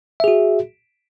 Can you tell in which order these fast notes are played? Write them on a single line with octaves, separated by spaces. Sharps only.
E5 G#4 F#4